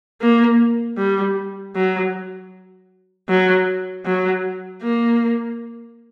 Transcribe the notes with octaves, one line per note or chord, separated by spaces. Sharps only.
A#3
G3
F#3
F#3
F#3
A#3